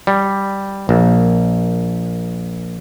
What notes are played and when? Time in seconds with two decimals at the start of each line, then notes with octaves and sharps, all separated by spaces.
0.07 G3
0.89 A#1